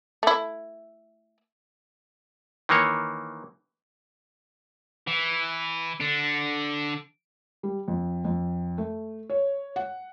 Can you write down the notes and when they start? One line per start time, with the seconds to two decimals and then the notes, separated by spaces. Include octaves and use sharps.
0.23 A3 E4
2.69 D#3 E3 A#3 C#5
5.07 E3
6.00 D3 D4
7.63 G3
7.88 F2
8.25 F2
8.78 A3
9.30 C#5
9.76 F#5